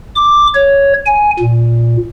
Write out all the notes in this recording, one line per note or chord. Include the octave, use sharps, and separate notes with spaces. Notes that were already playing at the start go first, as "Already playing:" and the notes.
D6
C#5
G#5
A#2